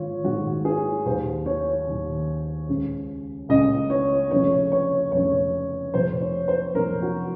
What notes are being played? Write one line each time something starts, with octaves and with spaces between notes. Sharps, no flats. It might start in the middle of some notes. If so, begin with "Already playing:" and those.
Already playing: G#1 G#2 D#3 F4 C#5
G#1 G#2 D#3 F#4
G#4
D#2 D#3 C5
C#5
D#2 D#3
C#2 C#3
C#2 C#3 D#5
C#5
F1 F2 C#3 C#5
C#5
F1 F2 C#3 C#5
F1 F2 C3 C5
C#5
C5
F1 F2 C3 A#4
F#4